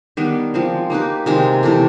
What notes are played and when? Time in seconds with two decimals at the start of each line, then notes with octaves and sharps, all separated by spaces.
0.17 D#3 G3 B3 D4
0.54 F3 G#3 C4
0.90 A#3 D#4 G4 B4
1.26 C3 D#3 G#3 C4
1.63 C3 E3 A3